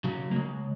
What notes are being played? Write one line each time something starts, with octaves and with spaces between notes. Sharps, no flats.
C#3 F#3
A#3
C#3 G#3